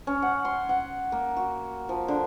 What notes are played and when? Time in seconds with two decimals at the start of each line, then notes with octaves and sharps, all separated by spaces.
0.07 C#4
0.22 F#5
0.45 C6
0.69 F#5
1.12 A#3
1.37 F#4
1.89 F3
2.08 D3